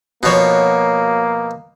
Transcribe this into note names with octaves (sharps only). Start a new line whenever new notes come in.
B2 F3 A#3 F#4 C#5